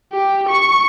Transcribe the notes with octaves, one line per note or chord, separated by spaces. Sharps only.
G4
C#6 C#7